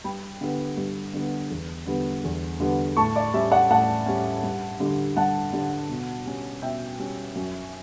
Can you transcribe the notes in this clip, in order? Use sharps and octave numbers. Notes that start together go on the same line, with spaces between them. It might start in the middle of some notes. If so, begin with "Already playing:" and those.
G2 G5 B5
D3 G3 B3
G2
D3 G3 B3
E2
D3 G3 B3
E2
D3 G3 B3
A2 A5 C#6
D5
G3 C#4 E5
D5 F#5
A2 F#5 A5
G3 C#4
G2
D3 G3
G2 F#5 A5
D3 G3
B2
G3 C#4
B2 E5 G5
G3 C#4
F#2